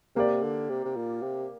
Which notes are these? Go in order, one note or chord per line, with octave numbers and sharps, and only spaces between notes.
C3 A#3 G4 D5
D3
C3
C3
A#2
C3